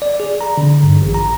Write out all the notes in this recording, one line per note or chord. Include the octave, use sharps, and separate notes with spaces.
D5
G#4
A#5
D3
G2
A1
A#5